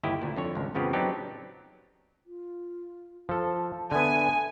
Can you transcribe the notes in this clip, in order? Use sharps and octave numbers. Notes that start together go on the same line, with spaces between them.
G1 D#2 E4 G4 D#5
D2 A#2
F2 D3 C#5
G#1 C#2
A1 F2 C#3 F3 B3 G4
F#3 B3 C4 D4 D#4 G4
F4
F3 A4 A5
D3 B3 E5 G#5